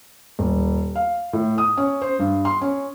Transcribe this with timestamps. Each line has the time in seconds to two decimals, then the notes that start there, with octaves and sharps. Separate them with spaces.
0.39 D#1
0.96 F5
1.33 A2
1.58 D#6
1.77 C#4
2.02 C5
2.19 G2
2.45 C6
2.61 C#4